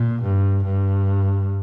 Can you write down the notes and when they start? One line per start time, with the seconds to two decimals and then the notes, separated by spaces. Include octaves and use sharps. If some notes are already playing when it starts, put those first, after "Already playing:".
Already playing: A#2
0.23 G2
0.65 G2